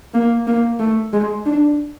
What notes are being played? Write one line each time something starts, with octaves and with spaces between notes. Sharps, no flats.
A#3
A#3
A3
G#3
D4